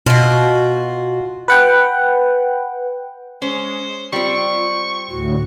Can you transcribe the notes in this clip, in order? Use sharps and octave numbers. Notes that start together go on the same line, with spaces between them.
B2 F4 F#4
B4 F#5 G5
G#3 C#4 C5
G3 C4 F4 C#6
D2 A2 F#4